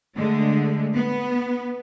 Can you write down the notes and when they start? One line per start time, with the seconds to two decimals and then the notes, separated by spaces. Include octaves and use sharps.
0.16 D3 G#3 A3
0.95 B3